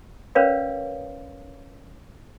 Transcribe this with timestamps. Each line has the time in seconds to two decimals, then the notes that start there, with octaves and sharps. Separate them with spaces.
0.35 C#4 A#4 B4 C#5 D5 F5